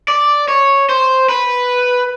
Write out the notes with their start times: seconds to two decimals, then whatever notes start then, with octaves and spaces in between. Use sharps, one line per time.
0.08 D5
0.48 C#5
0.89 C5
1.29 B4